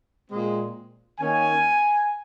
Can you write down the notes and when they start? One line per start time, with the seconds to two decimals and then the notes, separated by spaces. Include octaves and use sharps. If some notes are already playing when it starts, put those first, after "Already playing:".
0.29 A#2 G#3 C4
1.19 D#3 A#3 C#4 G#5